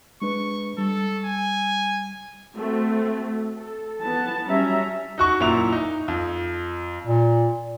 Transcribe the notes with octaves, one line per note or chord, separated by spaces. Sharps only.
G#3 D4 B4 C#6
G3 A4
G#5
A3 C4 F#4
A4
B3 A5
F#3 G3 C#4 E5 A#5
D#4 F#4 C#6
F#2 A#2 E4 F7
D#4
F2
A#2